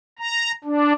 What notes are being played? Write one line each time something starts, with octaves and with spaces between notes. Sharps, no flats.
A#5
D4